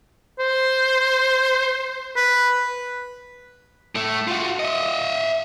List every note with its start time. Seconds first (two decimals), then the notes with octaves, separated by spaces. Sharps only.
0.39 C5
2.16 B4
3.95 A2 A3
4.28 F4 F#4
4.59 D#5 E5